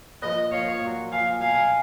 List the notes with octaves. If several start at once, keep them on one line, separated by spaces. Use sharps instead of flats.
A#2 F3 B4 D#5
A#2 F3 C#5 F5
A#2 F#3
A#2 F3 F5 G#5
B2 F#3 F5 G#5